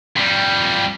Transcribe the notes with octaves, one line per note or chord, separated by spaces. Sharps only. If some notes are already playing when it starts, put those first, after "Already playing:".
F2 G3